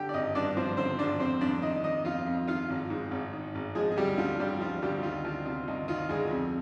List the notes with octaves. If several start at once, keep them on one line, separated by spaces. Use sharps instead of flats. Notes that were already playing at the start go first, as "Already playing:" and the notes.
Already playing: D3 G4 G5
D5
G#1 D#4 D#5
G2 D4 D5
F3 C4 C5
D3 C4 C5
G#1 D4 D5
F2 C4 C5
F2 D4 D5
D#3 D#4 D#5
D#3 D#4 D#5
F2 F4 F5
F2
D#3 F4 F5
G#1
G#2
G#1
D#3
G#1
F3 G#3 G#4
G#4
D2 G3 G4
D3 F4
D2 G3 G4
F3 F4
D2 G3 G4
D#3 F4
D2 F4
C3 F4
D2 D#4
D#3 F4
D2 G#3 G#4
F2